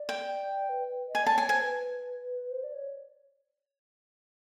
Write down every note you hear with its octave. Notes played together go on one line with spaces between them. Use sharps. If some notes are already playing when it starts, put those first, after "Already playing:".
Already playing: D5
G5
B4
D#5
G#5
D5 A5
C#5 G#5
C5 G#5
B4
C5
D5
C#5